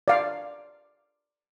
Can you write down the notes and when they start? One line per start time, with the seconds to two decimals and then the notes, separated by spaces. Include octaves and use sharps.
0.08 D5 F5